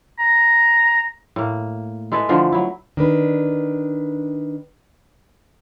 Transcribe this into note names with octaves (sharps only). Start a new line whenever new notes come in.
A#5
A2 A#3
G#3 E4 A4 B4
D3 E3 F3 A3
F#3 E4
D#3 D4 B4